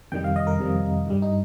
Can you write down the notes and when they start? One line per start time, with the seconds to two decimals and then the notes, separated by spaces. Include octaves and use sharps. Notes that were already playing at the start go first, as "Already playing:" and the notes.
0.12 F2 C3 D#3 G3 G5
0.24 F5
0.36 D#5
0.47 A#4
0.59 F2 C3 D#3 G3
1.07 G2 G3
1.22 D#4